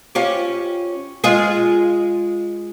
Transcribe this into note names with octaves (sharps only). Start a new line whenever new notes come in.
C#4 F4 G4
G#3 F4 G#4